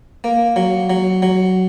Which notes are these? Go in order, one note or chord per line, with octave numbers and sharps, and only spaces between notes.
A#3
F#3
F#3
F#3